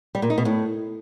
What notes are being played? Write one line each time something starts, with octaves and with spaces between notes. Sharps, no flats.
G3
A#2
D#4
B2
A2